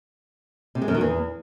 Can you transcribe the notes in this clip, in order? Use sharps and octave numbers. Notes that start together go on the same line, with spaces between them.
C3
G#3
F#2
D#3
E2